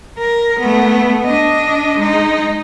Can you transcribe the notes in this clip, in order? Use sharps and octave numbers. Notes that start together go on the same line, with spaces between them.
A#4
A3 B3
D4 D#5
G#3 D#4